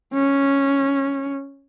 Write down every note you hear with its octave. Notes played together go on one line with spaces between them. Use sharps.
C#4